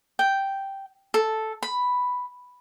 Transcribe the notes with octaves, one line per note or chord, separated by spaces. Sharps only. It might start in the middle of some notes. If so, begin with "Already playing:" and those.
G5
A4
B5